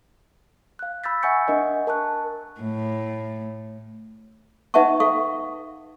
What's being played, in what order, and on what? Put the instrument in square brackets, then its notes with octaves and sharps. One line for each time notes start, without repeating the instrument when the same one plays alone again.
[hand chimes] F5 F#6
B5 E6 G6 A6 B6
E5 F#5 G#5 C#6 G6 C#7
D4 A#4 D#5 F#5
A#4 A5 C#6 F#6
[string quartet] A2
[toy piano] D#4 B4 E5 F#5 A5 C#6
A4 F5 C#6